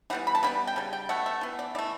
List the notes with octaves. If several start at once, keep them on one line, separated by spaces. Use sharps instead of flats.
E3 G3 B3 F#5
B5
A5
C#3 G3 B3 B5
G5
C#3 G3
G5
B2 A3 F#5
E5
E3 B3
D5
E3 A3 D5